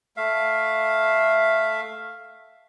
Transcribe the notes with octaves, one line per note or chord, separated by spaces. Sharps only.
A3 E5 F5